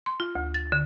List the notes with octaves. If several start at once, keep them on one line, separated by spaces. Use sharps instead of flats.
C6
F4
D2
A6
D3